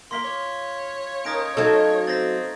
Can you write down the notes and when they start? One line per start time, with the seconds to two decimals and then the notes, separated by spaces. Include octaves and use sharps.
0.11 A#3 F4 F5 C6 D6 B6 G7
0.24 C#5
1.25 C#4 D#4 A#4 D#6 A#6 D7
1.57 F#3 A3 D#4 A4 F5 G#6
2.07 C4 A6 A#6